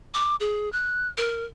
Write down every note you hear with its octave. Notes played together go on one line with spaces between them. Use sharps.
D6
G#4
F#6
A#4